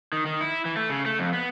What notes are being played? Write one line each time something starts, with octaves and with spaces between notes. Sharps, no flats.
D#3
D#3
E4
E3
A3
C#3
A3
F2
B3